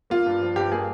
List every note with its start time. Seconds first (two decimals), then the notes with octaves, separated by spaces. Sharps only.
0.10 A#3 F4
0.26 G2
0.42 F3
0.56 G2 G4
0.72 A#3 G#4